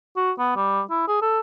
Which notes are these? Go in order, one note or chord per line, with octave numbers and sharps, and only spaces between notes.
F#4
B3
G3
E4
G#4
A4